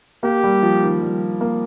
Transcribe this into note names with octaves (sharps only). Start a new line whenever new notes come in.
A#3 G4
G3
F3
D#3
G3
A#3